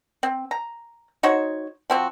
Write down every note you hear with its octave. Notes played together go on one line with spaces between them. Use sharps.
C4
A#5
D#4 F#4 C5 C#5
F3 C4 F#4